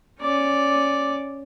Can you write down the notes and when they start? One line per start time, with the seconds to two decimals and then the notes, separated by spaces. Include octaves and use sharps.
0.20 C#4 D5